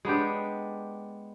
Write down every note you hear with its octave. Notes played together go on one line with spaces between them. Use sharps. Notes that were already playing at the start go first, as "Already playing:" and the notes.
G#3 B3 D4 G4